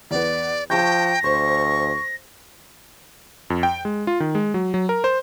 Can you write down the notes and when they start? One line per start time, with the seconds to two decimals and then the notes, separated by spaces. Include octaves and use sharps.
0.11 E2 B3 D5
0.70 F3 G5 A5 C#6 G6 A#6
1.24 D2 C5 C#6
3.50 F2
3.63 G5
3.85 G#3
4.07 F4
4.20 D#3
4.35 G#3
4.54 F#3
4.74 F#3
4.89 A#4
5.04 C5